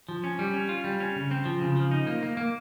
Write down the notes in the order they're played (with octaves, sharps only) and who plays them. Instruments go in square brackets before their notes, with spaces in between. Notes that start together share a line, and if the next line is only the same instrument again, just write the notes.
[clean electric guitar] F3
C#4
G3
C#4
F4
G3
C#4
C#3
C4
F3
C#3
F3
D#4
A#3
A#3
A#3